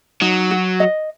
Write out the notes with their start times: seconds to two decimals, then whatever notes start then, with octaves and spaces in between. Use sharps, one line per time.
0.21 F#3 D#4
0.51 F#4
0.80 D#5